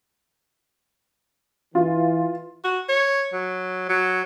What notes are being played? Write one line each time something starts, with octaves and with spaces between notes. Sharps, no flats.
E3 F4
F#4
C#5
F#3
F#3